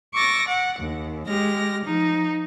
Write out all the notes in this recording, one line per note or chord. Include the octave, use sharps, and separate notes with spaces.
C#6 D6 E6 A6 A#6
F#5
D#2
G#3 G4 F6 A#6
F3 D#4